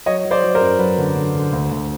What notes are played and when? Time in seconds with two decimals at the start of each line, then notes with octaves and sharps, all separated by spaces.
0.06 F#3 C#5 D#5
0.25 F#3
0.31 C5 D5
0.44 F#3
0.55 A#4 C5
0.61 F#2
0.79 F#3 B4
0.98 D3
1.17 D3
1.35 D3
1.52 D2
1.71 D2